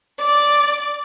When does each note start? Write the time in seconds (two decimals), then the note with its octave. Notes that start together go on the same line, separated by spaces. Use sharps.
0.19 D5